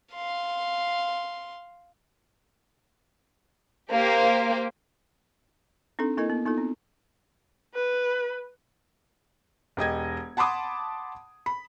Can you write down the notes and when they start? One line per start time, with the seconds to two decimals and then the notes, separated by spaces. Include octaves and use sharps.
0.14 F5 C6
3.92 A#3 G4 C5
5.99 C4 D4 D#4 A4
6.17 A#3 E4 A4 A#4 D#5
6.30 B3
6.46 B3 D#4 F4 A4
6.58 C4
7.74 B4
9.77 E1 G4 D#5 G#6
10.37 F#5 A5 B5 C6 D6 D#6
11.46 B5